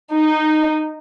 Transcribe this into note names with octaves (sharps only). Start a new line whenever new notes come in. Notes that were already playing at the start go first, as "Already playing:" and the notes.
D#4